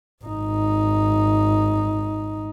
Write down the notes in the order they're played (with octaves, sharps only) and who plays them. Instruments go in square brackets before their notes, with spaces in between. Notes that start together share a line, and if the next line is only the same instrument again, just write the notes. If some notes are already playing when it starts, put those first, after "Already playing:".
[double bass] G#1 D#4